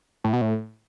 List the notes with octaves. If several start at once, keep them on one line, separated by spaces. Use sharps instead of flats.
A2
B2
A2